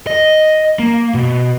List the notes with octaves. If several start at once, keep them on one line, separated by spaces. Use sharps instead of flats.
D#5
A#3
B2